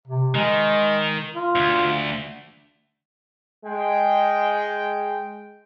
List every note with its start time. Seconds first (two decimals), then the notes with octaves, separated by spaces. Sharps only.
0.07 C3
0.35 D#3 G#3
1.34 F4
1.56 D2
3.65 G#3 G5